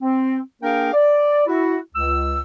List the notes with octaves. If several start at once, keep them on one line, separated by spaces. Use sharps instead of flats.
C4
A#3 D4 G#4 A#4 F5 G5
D5
E4 F#4
C#2 E6